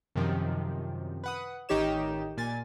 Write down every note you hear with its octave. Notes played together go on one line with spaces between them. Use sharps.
F#2 C3 D#3 F3
B4 F#5 D#6
A1 D#3 D#4 G4 C#5 E7
A#2 G#5 A6